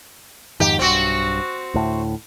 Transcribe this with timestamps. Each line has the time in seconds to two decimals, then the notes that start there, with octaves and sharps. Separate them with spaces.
0.60 F2 G#2 D#3 G4
0.79 B1 G2 C4 F#4
1.74 D2 A2